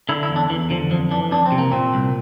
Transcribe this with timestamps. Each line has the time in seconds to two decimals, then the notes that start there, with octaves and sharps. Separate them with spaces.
0.09 D3 E4
0.23 E4
0.29 E2
0.36 D4
0.49 E2 E3
0.70 D3 F3
0.91 F2 F3
1.11 E3 D4
1.31 F2 D4
1.46 C4
1.52 C3
1.58 A#3
1.71 A#2 C4
1.94 C2